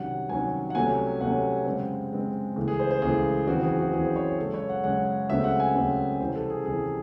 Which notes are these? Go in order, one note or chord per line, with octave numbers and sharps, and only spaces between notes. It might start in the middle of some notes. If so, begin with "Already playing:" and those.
Already playing: C2 C3 D#3 F#3 C#4 F#5
C2 C3 D#3 F#3 C#4 G#5
F#5
C2 C3 F#3 A3 C#4 G#5
C2 C3 F#3 A3 C#4 F#5
F#2 C#3 G#3 C4
F#2 C#3 G#3 C4
C#2 C#3 E3 A3
G#4
C5
C5
C#2 C#3 E3 A3 G#4
F#1 E2 C#3 E3 C4 F#4
G#4
F#4
F#1 E2 C#3 E3 C4 G#4
C5
C#5
F#2 C#3 G#3 C#4 A4
C#5
F#5
F#2 C#3 G#3 C#4 F#5
C#2 C#3 F#3 A3 C4 E5
F#5
G#5
C#2 C#3 F#3 A3 C4 F#5
C2 C3 E3 C5
A4
G#4
C2 C3 E3 G#4